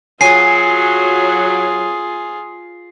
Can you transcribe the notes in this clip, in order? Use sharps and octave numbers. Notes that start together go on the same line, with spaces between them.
F#3 F4 G#4 G#5 C7